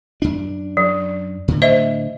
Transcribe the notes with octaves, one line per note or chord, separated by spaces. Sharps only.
F#2 D4
F#3
A2 D3
C5 D#5 E5